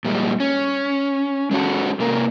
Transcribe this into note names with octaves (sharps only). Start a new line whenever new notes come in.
A#2 G3 G#3
C#4
G#3 A3 C#4 F#4 A4
C3 A#3 A#4